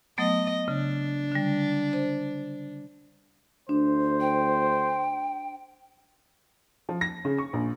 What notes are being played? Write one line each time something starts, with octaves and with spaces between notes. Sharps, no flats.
F#3 A3 B3 D#5
C#3 D4
D3 G3
C5
D2 D4 C5
G5
F3
A#6
C#3
C#6
A#1